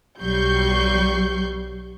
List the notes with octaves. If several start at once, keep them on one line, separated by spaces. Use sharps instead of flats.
B1 F#3 G3 C#6 G6 C7